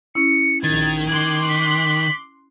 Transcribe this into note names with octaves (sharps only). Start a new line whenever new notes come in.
C#4 E4 C#7
A#1 D#3 G#6 A6
C6 D6 F#6 G#6
B6